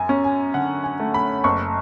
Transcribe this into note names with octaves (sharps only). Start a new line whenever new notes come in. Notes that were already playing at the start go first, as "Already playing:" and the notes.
Already playing: F#2 G#5
C#4
G#5
D3 F#5
G#5
A3
B5
F#1 C#6